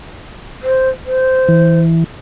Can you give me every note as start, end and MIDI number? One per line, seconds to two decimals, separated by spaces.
0.63 0.89 72
1.06 1.80 72
1.48 2.04 52